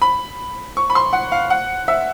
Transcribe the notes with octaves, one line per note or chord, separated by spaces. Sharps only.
B5
C#6
B5
C6
F#5
F5
F#5
E5